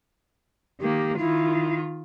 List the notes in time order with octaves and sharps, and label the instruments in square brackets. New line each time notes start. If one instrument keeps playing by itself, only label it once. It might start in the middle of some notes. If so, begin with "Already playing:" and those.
[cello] D#3 A#3 [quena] G4
[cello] D#3 F4 [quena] E4